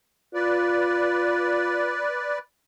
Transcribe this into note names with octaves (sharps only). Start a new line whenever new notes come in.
F4 B4 D5